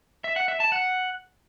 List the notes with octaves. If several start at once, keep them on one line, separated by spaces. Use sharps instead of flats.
E5
F#5
E5
A5
F#5